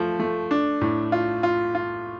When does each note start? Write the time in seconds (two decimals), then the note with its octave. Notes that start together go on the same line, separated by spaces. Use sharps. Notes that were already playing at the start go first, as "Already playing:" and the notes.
Already playing: F3 A3
0.20 A3
0.51 D4
0.81 A2
1.12 F4
1.43 F4
1.75 F4